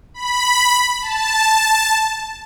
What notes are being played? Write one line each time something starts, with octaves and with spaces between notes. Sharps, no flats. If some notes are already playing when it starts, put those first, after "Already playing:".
B5
A5